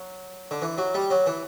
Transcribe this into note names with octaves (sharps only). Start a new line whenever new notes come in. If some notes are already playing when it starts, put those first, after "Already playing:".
Already playing: F#3
D3
E3
F#3
G3
F#3
E3